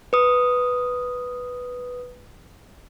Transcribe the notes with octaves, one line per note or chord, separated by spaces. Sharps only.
B4 D#6